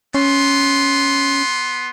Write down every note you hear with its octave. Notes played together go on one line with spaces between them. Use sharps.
B3 C#4 C6